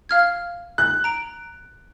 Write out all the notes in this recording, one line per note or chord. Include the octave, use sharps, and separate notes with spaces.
F5 F6 G#6
F#6
A#5 D7